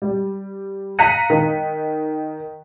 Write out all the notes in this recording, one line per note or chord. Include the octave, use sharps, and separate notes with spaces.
G3
F5 A#5 F#6 B6 C#7 D#7
D#3